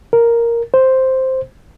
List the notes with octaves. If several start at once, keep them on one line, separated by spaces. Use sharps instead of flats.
A#4
C5